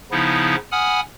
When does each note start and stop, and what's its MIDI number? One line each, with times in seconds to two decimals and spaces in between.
0.11 0.55 49
0.11 0.55 53
0.11 0.55 59
0.11 0.55 63
0.11 0.55 64
0.72 1.00 78
0.72 1.00 80
0.72 1.00 83
0.72 1.00 87
0.72 1.00 89